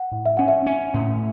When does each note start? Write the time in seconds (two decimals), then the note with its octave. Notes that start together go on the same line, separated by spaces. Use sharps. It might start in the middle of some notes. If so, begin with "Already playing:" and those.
Already playing: F#5
0.12 A2
0.26 E5
0.37 C#4 F#5
0.48 E5
0.66 C#4
0.94 A2